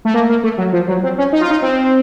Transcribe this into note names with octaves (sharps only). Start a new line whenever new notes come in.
A3
A#3
A#3
A3
F#3
F3
F#3
C4
C#4
D#4
F4
D#4
C4